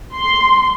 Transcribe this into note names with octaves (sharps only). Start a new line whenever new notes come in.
C6